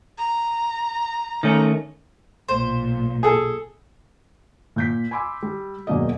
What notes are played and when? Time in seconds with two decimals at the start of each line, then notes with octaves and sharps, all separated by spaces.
0.18 A#5
1.43 D#3 A3 C#4
2.48 B1 A#2 C5
3.23 G#4 A4
4.76 A#2 G6 B6
5.11 G#5 B5 C6 D6 E6
5.43 G3
5.87 E1 F#2 B2 A#3 D5 D#5